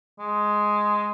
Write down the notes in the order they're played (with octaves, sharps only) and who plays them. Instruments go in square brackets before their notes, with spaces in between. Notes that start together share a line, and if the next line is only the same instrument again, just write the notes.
[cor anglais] G#3